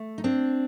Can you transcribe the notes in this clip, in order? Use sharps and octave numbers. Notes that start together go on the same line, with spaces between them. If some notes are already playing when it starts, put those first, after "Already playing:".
Already playing: A3
D#4
C4 D4